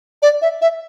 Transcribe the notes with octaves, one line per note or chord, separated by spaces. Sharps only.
D5
E5
E5